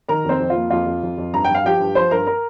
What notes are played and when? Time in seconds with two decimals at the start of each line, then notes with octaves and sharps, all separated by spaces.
0.08 D#3 A#4 A#5
0.25 F2 C4 C5
0.40 F2
0.50 F4
0.56 A#3
0.70 F2 F4
0.86 F2
1.03 F2
1.18 F2
1.33 G2 A#5
1.45 G2 G5
1.55 F5
1.64 F3 G4 G5
1.80 G2
1.95 F3 C5 C6
2.11 G2 A#4 A#5
2.27 A#4 A#5